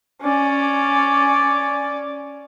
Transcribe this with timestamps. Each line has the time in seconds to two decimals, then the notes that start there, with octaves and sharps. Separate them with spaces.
0.22 C#4 D5